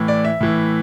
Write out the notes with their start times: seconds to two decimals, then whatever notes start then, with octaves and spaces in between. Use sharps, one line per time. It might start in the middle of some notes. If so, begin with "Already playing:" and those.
Already playing: A2 E3
0.08 D5
0.25 E5
0.41 A2 E3